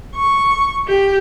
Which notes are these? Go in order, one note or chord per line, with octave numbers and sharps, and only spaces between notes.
C#6
G4